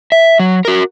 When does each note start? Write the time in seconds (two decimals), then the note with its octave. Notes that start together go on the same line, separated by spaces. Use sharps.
0.12 E5
0.40 F#3
0.65 F#4 A#4